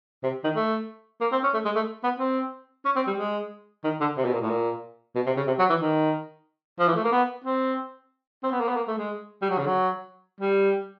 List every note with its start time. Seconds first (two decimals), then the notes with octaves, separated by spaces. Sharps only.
0.23 C3
0.44 D#3
0.56 A3
1.21 A#3
1.32 C4
1.43 C#4
1.54 A3
1.65 G#3
1.75 A3
2.03 B3
2.19 C4
2.85 C#4
2.96 C4
3.07 G3
3.18 G#3
3.84 D#3
4.00 D3
4.17 C3
4.25 B2
4.33 A#2
4.41 A2
4.50 A#2
5.15 B2
5.26 C3
5.37 C#3
5.47 C3
5.59 F#3
5.69 E3
5.81 D#3
6.79 F3
6.88 E3
6.95 A3
7.04 A#3
7.12 B3
7.45 C4
8.43 C4
8.52 B3
8.60 A#3
8.68 B3
8.76 A#3
8.88 A3
8.98 G#3
9.42 G3
9.50 F#3
9.58 C#3
9.66 F#3
10.40 G3